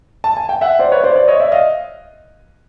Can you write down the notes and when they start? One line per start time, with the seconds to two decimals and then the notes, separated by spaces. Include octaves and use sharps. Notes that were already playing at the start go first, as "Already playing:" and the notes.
0.24 A5
0.37 G#5
0.49 G5
0.61 E5 F#5
0.79 C5 D5
0.92 B4 C#5
1.04 C5 D5
1.15 C5 D5
1.28 C#5 D#5
1.40 D5 E5
1.52 D#5 F5